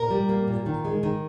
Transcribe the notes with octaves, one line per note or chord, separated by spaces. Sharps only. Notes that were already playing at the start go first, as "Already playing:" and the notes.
Already playing: A#2 A#4
G3
A#3
A#2
D#3
G#3
D#3